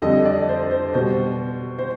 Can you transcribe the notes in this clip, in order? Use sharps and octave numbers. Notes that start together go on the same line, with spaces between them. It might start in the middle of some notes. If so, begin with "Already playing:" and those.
F2 D3 G3 D#5
D5
C5
C5
B2 G3 C5
C5